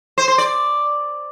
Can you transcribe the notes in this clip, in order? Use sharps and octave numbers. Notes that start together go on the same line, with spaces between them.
C5
C5
D5